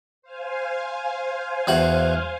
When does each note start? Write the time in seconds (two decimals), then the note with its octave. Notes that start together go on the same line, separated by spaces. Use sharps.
0.22 C5 F5 G#5
1.67 E2 F#4 F#5